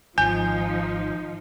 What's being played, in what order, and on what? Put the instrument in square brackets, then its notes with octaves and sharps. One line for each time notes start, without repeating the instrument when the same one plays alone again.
[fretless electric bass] G#1 [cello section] F3 D#4 [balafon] G#5 [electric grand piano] G6